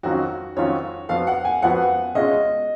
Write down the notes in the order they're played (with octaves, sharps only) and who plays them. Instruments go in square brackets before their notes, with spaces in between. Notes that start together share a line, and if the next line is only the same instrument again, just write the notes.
[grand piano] F2 D#3 F#3 C#4 F4 [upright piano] F#4
[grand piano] F2 D#3 F#3 C#4 F4 [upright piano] C#5
[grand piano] F2 F3 B3 F#4 [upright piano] F5
[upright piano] F#5
G#5
[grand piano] F2 F3 B3 F#4 [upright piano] F#5
[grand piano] B2 G#3 C#4 F4 [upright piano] D#5